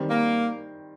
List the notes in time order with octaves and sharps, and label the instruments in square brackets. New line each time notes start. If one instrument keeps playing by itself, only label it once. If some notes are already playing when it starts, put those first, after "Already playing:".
Already playing: [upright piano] D#3 G3 C4
[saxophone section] A#3